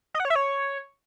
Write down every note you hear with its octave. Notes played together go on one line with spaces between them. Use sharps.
D#5
F#5
C#5
E5
C#5